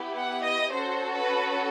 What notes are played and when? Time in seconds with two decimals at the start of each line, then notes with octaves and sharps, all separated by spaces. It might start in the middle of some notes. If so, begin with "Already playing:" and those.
Already playing: B3 E4 G4
0.16 F#5
0.44 D#5
0.72 C#4 F#4 A4 C5
1.14 B4